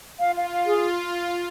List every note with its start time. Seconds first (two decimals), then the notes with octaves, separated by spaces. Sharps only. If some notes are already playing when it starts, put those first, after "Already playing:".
0.20 F4 F5
0.35 F5
0.51 F5
0.66 G#4